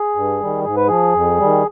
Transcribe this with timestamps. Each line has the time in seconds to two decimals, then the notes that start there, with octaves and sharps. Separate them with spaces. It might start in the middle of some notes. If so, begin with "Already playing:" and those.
Already playing: G#4
0.16 G2
0.41 D#3 G3
0.64 G#2 G#4
0.76 B4
0.87 F3 G#4
1.14 F2
1.39 D#3 G3